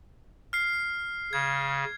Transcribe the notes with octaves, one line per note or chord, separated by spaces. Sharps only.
F6 C7
C#3 G#6